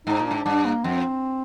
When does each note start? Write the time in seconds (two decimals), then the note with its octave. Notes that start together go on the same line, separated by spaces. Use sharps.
0.07 G#2 D#4
0.19 A#2
0.26 G#2 D4
0.45 G2 D4
0.65 A#3
0.84 F2 C4